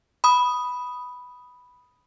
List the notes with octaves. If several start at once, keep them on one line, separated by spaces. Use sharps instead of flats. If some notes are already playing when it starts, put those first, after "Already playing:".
B5 D#6